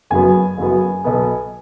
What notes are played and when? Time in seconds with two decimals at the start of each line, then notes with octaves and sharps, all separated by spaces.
0.10 F#1 F#2 F#3 B3 G#5
0.57 F#1 F#2 F#3 B3
1.04 B1 B2 F#3 B3